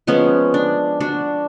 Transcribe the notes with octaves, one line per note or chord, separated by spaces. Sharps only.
F3 G#3 B3 C#4
D4
D4 F#4